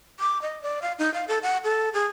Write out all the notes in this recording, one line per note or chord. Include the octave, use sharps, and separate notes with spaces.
D6
D#5
D5
F5
D#4
F5
A4
F#5
A4
G#4